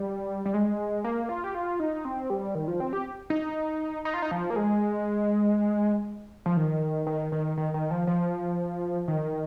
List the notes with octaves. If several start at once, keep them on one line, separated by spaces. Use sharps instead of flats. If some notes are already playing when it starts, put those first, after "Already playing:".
Already playing: G3
G3
G#3
A#3
F4
G4
F4
D#4
C4
G3
D#3
F3
C4
G4
D#4
D#4
F4
D#4
F3
A#3
G#3
F3
D#3
D#3
D#3
D#3
D#3
F3
F3
D#3